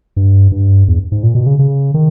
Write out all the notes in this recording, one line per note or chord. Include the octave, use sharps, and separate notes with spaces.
G2
G2
E2
G#2
A#2
B2
C#3
C#3
D#3